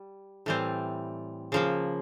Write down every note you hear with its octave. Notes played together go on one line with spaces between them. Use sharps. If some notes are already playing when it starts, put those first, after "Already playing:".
Already playing: G3
A2 E3 G3 C4
C#3 F3 A#3